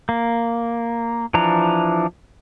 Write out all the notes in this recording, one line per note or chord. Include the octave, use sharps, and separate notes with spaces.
A#3
E3 F3 D4 A#5